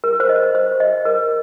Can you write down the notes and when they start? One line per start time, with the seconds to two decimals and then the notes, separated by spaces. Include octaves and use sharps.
0.04 A#4
0.20 C5
0.29 D#5
0.55 C5
0.80 D#5
1.05 A#4